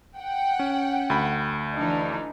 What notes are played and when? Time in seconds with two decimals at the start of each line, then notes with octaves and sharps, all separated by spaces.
0.19 F#5 G5
0.59 C#4
1.10 D2 B5
1.75 E3 D4 D#4